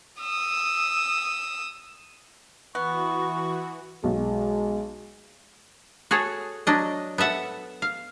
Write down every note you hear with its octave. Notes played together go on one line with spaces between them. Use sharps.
D#6 E6
E3 B3 F#4 C#6
B1 G#3
F#4 G#4 A4 C#5
F#3 D4 D#5
B3 A4 E5 F#5
F5